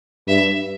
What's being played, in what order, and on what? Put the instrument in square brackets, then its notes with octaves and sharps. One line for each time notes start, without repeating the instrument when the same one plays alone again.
[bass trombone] G2 [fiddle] E5